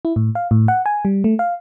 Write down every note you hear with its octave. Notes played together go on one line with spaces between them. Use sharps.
E4
A2
F5
A2
F#5
G#5
G3
A3
F5